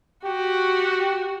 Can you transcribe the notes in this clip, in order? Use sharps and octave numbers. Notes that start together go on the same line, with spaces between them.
F#4 G4